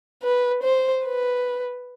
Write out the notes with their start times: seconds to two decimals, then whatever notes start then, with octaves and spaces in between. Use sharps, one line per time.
0.23 B4
0.63 C5
1.05 B4